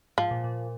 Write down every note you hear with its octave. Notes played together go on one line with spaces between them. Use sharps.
G#2 F3
A#2
A#2